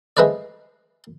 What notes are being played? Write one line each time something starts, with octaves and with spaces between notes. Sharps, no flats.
G#3 A3 B4 C5 D5